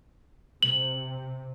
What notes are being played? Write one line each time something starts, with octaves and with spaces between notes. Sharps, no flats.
C3 F#7